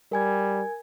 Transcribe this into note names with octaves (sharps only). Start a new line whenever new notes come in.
G3 A#4 G#5 G#6